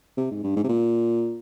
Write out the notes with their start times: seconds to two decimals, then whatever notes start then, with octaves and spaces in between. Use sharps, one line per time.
0.17 C3
0.31 G#2
0.43 G2
0.56 G#2
0.64 C3
0.69 A#2